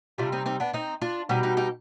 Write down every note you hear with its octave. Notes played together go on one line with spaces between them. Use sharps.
C3 G3 D4 F4
C4 D#4
C4 D#4
B3 D4
C4 D#4
D4 F4
B2 G3 C4 D#4
D#4 G4
D#4 G4